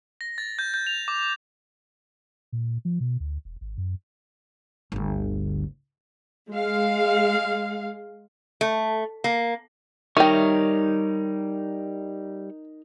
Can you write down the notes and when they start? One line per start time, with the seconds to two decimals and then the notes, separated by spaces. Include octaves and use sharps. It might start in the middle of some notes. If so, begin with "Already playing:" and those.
0.21 A#6
0.38 A6
0.59 G6
0.74 G6
0.87 F7
1.08 D6
2.52 A#2
2.85 F3
3.00 B2
3.20 D2
3.45 E1
3.61 G#1
3.78 F#2
4.92 G1 D2
6.51 G#3 F5
8.61 A3
9.24 A#3
10.17 G3 D#4 A#4 C#5 E5 G5 C#6